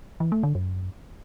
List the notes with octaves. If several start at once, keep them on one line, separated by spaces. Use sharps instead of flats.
E3
A3
D3
F#2